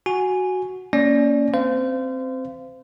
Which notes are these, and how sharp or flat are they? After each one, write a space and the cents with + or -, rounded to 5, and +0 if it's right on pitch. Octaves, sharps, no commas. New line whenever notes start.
F#4 +0 G#5 +0
A#3 +0 C#4 +20 D5 +0
C4 +5 C5 -30 F5 -25